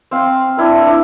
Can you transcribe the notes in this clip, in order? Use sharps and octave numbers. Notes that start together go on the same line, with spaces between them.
C4 F5 C6
D4 E4 B4
D4 E4